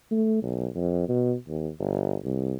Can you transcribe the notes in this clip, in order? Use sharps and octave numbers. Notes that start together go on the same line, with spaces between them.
A3
B1
F2
B2
D#2
G1
C2